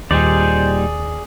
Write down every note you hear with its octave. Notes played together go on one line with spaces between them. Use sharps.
D#2 A#2 G3 D#4 G#4 C5 D5